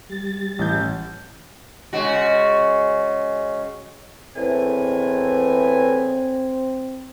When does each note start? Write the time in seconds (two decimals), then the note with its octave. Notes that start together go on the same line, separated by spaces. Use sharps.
0.10 G3 A6
0.59 A1 G6
1.93 C#3 G#3 F#4
4.36 E2 A2 C4 G#5